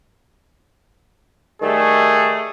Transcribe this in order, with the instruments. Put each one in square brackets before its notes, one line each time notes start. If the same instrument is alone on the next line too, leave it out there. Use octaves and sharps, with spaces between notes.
[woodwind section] D#3 G3 A3 [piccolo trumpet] G#4